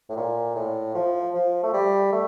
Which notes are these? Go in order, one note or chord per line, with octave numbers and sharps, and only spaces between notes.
A2
A#2
A2
F3
F3
A3
G3
A3